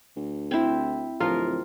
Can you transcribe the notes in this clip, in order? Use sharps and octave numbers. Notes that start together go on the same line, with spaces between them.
D2
C4 E4
D1 F3 F4 A#4